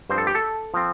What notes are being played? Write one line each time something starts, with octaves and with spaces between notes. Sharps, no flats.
G2 F3 C4 C5
A4
G4
A4
F3 C4